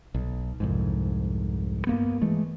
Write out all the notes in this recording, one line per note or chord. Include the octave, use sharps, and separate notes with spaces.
B1
C2 F2 G#2
G2 A#3 B3
E3 G#3 A3